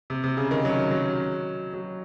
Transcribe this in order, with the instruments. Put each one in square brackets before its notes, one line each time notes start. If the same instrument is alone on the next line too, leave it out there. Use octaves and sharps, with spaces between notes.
[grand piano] C3
C3
C#3
D#3
F#3
F#3
F#3